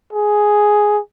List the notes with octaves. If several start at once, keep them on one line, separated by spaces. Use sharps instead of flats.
G#4